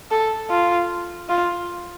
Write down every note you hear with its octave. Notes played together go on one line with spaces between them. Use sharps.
A4
F4
F4